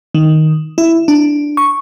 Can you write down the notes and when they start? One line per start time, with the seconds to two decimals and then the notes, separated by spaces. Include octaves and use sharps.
0.15 D#3
0.78 E4
1.08 D4
1.57 C#6